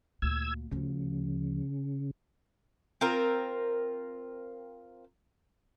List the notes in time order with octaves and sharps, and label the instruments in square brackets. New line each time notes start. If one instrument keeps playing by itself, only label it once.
[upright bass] D2 A#2 [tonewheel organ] E6 G#6
[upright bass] D2 F3 [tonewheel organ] C#3
[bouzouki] C4 F4 A#4